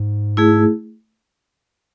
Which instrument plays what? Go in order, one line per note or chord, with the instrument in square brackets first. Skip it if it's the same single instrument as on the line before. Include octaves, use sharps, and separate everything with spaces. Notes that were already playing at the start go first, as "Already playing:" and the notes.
Already playing: [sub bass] G#2
[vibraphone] A3 E4 G#4